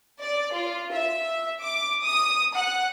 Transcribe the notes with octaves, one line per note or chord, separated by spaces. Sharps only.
D5
F4
E5
D6
D#6
F#5